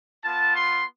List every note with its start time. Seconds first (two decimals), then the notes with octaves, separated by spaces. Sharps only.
0.23 B3 F4 A5
0.56 C6